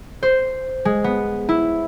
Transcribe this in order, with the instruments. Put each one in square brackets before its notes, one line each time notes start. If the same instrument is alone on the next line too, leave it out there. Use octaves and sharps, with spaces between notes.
[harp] C5
G#3
B3
E4